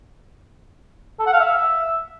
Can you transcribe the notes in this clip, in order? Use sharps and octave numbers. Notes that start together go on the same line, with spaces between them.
A4
F#5
F5
E5